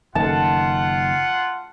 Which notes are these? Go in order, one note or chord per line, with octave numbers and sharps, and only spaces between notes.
F#1 D#3 F4 F#5 A5